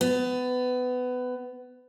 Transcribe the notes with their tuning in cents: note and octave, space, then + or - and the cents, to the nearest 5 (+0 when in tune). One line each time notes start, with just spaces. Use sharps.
B3 +20